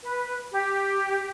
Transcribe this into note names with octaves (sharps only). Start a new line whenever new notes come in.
B4
G4